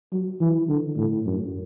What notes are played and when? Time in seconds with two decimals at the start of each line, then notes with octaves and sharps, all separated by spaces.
0.12 F#3
0.41 E3
0.69 D3
0.97 A2
1.26 F#2